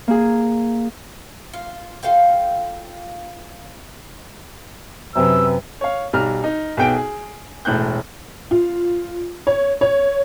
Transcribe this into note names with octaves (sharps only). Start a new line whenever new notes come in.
A#3 G#4
F4
F4 A4 F5 G5
F#2 C3 B4 E6
C#5 F5
B1 G3 A#5 F6
D#4
B1 B3 G#4 G5 D7
G#4
E1 A2 F#6 G6
F4
C#5
C#5